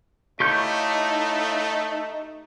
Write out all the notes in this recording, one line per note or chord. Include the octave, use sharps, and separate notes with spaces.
A3 D#4 E4 G4 C#5 F5 C#6 G6